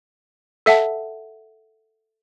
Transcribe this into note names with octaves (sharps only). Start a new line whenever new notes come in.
A4 E5 F#5 A5